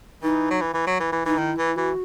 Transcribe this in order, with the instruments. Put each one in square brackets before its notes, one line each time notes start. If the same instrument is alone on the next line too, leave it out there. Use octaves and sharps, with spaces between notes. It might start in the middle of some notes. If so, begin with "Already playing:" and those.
[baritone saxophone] E3 [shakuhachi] D#4
[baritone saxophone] F#3
E3
E3
F#3
E3
E3
[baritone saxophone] E3 [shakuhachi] D#4
[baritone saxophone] D#3 [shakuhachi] E4
[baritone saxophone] E3
[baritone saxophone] E3 [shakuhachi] F#4